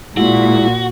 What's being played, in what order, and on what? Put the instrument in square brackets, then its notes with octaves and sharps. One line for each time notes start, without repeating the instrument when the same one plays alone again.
[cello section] A#2 [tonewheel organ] G#3 E4 [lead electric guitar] F#4